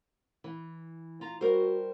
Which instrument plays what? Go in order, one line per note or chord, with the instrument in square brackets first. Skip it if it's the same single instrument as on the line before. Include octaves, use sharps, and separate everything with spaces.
[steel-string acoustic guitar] E3
F4 A#5
[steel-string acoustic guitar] G3 A#4 C5 [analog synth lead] F#4